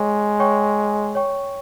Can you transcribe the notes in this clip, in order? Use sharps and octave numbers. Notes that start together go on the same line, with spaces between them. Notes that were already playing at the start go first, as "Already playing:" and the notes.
Already playing: G#3 C#5 G5 C#6
C#5 G5 C#6
C#5 G5 C#6